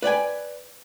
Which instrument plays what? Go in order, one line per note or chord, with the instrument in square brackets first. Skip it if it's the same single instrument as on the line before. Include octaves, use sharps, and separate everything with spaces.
[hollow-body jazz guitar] B4 D5 G5 G#5